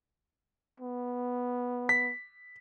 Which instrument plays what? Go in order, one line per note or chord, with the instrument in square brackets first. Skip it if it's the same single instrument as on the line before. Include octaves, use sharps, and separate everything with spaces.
[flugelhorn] B3
[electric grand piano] B6